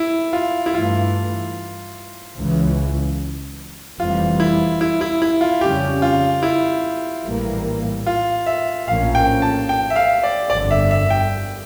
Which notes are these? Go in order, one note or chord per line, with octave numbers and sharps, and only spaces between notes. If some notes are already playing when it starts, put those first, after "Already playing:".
Already playing: E4
F4
E4
G2 E3 A3 F4
C#2 C#3 E3
F1 F2 E3 G3 F4
E4
E4
E4
E4
F4
F2 C#3 G3 C#4 G4
F4
E4
A#1 A2 E3 G3 A#3
F4
E5
A#1 A2 F3 A#3 C#4 F5
G5
A5
G5
E5
F5
D5
G1 F2 D3 D5
E5
E5
G5